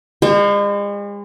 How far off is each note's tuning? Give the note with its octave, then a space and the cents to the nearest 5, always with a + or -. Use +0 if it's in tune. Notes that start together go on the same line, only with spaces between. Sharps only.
G#3 -40 C5 +30